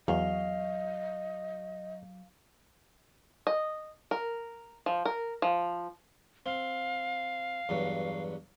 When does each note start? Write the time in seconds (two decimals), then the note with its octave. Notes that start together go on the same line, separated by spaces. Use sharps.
0.08 E2 F#3 D#5 F5
3.47 D#5
4.11 A#4
4.86 F3
5.05 A#4
5.42 F3
6.46 C4 F5
7.69 E2 G2 F#3